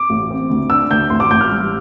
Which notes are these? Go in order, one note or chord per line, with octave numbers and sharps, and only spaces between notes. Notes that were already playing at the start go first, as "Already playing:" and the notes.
Already playing: D6
A1
C4
D2
D4 E6
D2 G6
A1 C6
D6
A1 G6
F6
G3